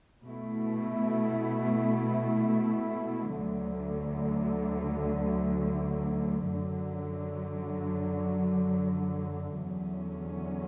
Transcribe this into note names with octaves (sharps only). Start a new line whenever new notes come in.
B2 A3 E4
D2 D3 F#3
F#2 D3 F#3
E2 D3 F#3 C#4